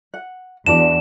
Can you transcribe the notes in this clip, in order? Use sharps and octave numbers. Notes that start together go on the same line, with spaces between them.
F#5
E2 D4 F#4 D5 E7